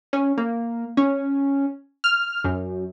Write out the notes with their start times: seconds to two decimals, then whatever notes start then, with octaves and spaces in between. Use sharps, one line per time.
0.13 C#4
0.38 A#3
0.97 C#4
2.04 F6
2.44 F#2